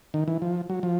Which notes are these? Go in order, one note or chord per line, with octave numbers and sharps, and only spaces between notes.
D#3
E3
F3
F#3
F3